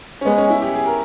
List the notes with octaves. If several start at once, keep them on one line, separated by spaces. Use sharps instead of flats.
C#4
G#3 B3
C#4
E4
G4
G#4
A#4